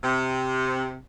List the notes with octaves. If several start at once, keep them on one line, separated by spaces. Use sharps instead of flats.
C3